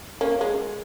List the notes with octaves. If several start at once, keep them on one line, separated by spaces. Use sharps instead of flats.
A#3 C#4
G#3